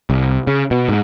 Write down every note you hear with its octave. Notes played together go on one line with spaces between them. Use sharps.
C2
C#3
B2
G#2